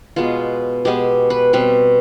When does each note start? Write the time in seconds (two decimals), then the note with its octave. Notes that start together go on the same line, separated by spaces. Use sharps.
0.16 B2 G#3 B3 F4
0.85 B2 G#3 B3 G4
1.30 B4
1.53 B2 G3 C4 B4